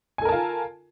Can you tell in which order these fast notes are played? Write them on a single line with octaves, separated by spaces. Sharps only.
G#5 A4 A#4 A5 F4